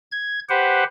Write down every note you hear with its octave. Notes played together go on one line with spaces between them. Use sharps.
G#6
G4 B4 C5 F#5